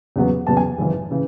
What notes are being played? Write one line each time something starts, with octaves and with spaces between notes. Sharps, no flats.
E2 C#3 F#3 B3
E2 C#3 F#3 B3 A5
G#5
G#1 F#2 C#3 E3
C#3 E3